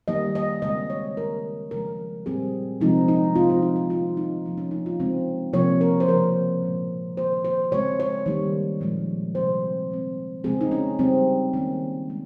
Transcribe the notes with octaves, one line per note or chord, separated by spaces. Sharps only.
D#3 G3 A#3 D#5
D#5
C#3 G#3 C4 D#5
C#5
D#3 A#3 A#4
C#3 F3 G#3 A#4
A#2 G3 C4 G#4
C3 F3 G#3 C4 D#4
D#4
C3 F3 C4 F4
F4
D#4
F4
D#3 G3 A#3 F4
D#4
C3 F3 A#3
C#4
D#4
F4
C#3 G#3 C4
C3 F3 A#3 C#5
A#4
C5
C#3 F3 A#3 A#4
A#2 F3 G#3
D#3 A#3 C5
C5
C#3 G#3 C4 C#5
C#5
D#3 G3 A#3
A#2 F3 G#3
C3 G3 C4 C5
D#3 G#3 C4
C#3 G#3 C4 G#4
D#4
C#4
C#3 G3 C4
D#3 A#3 C#4
G#3 C4